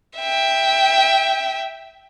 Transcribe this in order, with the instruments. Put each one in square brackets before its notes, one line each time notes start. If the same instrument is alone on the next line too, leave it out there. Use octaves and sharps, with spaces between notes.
[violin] E5 G5